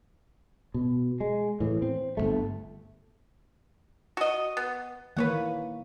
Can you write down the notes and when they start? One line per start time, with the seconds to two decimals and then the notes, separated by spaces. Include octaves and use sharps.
0.74 B2
1.21 G#3
1.60 A2 E3
1.82 C4
2.17 G1 D#2 A3
4.17 F#4 D#5
4.57 B3
5.17 D#3 E3 A#3 B4 C#5 F#5